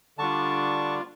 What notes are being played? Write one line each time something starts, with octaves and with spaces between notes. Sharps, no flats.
D3 G3 D4 F4 A5 C#6